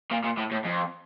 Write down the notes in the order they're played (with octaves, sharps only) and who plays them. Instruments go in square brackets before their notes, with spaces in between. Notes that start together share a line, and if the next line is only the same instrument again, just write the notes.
[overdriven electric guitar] A#2
A#2
A2
A2
F2